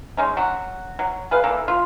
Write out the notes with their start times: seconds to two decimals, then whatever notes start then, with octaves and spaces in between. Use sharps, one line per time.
0.17 G#3 C#4 D#4
0.37 F#3 F#4
0.99 F#3
1.31 G#4 B4 F5
1.44 E3 A#3 A4
1.68 F4